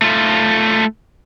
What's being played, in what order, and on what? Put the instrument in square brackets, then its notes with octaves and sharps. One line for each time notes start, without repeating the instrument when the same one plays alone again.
[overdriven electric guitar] A3 F4